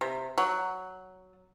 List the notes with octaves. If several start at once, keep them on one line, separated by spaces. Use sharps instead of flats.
C3
F#3